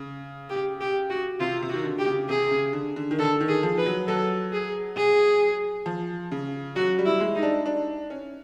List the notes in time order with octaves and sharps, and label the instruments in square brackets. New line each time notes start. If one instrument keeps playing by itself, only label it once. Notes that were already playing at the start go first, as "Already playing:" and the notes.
Already playing: [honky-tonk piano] C#3
[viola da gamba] G4
G4
F#4
[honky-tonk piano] C3 [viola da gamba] F4
[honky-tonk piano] C3
[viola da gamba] F#4
[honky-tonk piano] D#3
D3
[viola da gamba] G4
[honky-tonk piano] C#3
[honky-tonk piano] C3 [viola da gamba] G#4
[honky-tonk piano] C#3
D3
D3
D#3
[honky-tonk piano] D3 [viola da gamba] A4
[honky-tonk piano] D#3
[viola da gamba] G#4
[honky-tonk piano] F3
[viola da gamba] B4
[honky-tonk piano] F#3
[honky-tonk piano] F#3 [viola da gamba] A4
[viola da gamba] G#4
G#4
[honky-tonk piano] F3
C#3
[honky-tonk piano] F#3 [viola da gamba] F#4
[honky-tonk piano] G3
[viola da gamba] E4
[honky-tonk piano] G#3
[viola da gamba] D#4
[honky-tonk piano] D4
D4
C#4